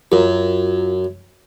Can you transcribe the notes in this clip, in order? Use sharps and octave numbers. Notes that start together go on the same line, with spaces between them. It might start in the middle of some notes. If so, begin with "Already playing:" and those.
F#2 F4 A#4